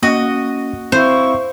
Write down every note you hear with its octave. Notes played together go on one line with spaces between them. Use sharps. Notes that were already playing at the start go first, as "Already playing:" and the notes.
A#3 C#4 F#4 D#5
C4 E4 C5 F5 C#6